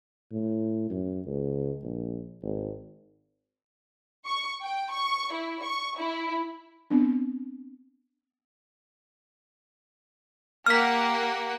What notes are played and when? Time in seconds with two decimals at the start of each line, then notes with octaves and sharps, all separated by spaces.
0.32 A2
0.90 F#2
1.27 C#2
1.83 A#1
2.43 G#1
4.25 C#6
4.63 G5
4.91 C#6
5.32 E4
5.62 C#6
5.98 E4
6.91 B3 C4 D4
10.66 A#3 G4 F#5 F6 B6